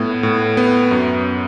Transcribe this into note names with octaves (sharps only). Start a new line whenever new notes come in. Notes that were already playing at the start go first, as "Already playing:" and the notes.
Already playing: A2 B3
A2
B3
F#2